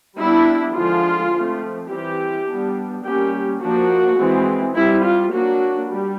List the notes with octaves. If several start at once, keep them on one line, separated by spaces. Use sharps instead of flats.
G3 B3 D4 E4
D3 F3 G#3 F4
F3 A3 C4
E3 G3 C4 G4
G3 B3 D4
G3 A#3 C#4 G4
F3 A#3 D4 F#4
E3 G#3 C4
G3 C4 E4
F4
F#3 A#3 D4 F#4
G3